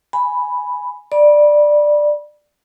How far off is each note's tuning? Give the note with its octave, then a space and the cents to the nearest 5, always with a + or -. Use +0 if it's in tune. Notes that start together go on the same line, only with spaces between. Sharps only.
G#5 +0 B5 +0
D5 +10 B5 -25